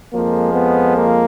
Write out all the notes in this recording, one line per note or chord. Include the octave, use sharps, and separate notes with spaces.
F2 F3 G#3 A#3
B3
A#3